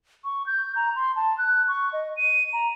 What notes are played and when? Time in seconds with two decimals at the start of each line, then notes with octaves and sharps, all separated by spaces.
0.24 C#6
0.46 G6
0.76 A#5
0.96 C6
1.16 A5
1.38 F#6
1.68 C#6
1.93 D#5
2.17 D#7
2.53 A#5